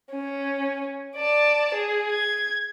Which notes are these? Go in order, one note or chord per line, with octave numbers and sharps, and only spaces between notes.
C#4
D5 A5
G#4
G#6